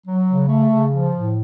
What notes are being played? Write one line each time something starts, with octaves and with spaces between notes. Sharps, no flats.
F#3
C#3
A3
C#3
F3
A2